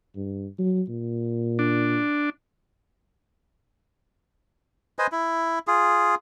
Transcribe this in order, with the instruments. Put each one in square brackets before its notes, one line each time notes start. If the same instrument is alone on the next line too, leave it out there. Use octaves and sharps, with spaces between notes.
[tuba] G2
F#3
A#2
[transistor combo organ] D4
[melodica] B4 C5 D#5 G#5
E4
F4 G#4